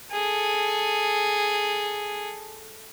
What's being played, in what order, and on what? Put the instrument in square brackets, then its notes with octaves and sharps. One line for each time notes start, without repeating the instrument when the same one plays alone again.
[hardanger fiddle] G#4 A4